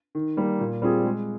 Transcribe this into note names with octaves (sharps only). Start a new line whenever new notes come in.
D#3
G3 A#3
A#2
G3 C4 F4 G#4
G#3